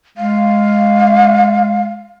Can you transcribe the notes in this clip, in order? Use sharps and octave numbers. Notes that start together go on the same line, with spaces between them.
G#3 F5